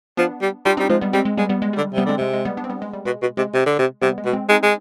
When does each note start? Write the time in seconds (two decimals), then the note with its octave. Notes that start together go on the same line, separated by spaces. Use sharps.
0.17 F3 B3 D4
0.42 G3
0.65 G3 D4 F4
0.77 G3 C4 D#4
0.90 F3 G#3
1.01 G3 B3
1.13 G3 G#3 C4
1.25 G#3
1.37 G3 G#3 B3
1.49 G3 B3
1.62 G#3
1.73 D3 G3
1.93 C3 G3 B3
2.06 D3 G#3 C4
2.18 C3 G#3
2.34 G#3
2.45 G3 B3
2.57 B3 D4
2.64 C4
2.70 G3 B3
2.82 G#3
2.93 G3
3.05 B2 G#3
3.22 B2
3.37 C3 G#3
3.54 C3
3.66 D3
3.79 C3
4.02 C3 G3 B3
4.18 G#3
4.26 B2
4.33 G#3 C4
4.49 G#3 C4 D#4
4.63 G#3